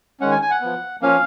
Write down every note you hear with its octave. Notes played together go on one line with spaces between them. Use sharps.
D#3 G#3 C#4 F#5
G#5
G#5
F#5
F3 B3
F3 A#3 C#4 F5